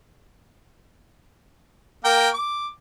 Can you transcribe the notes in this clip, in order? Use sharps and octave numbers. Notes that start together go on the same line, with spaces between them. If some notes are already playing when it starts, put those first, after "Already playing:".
A#3 A#4 G5
D6